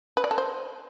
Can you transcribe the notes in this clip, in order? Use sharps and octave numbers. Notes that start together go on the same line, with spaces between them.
B4
D5
A4
C5